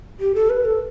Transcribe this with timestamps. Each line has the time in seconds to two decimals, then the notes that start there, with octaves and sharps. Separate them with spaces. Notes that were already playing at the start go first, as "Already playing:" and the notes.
0.20 G4
0.35 A4
0.50 B4
0.65 A4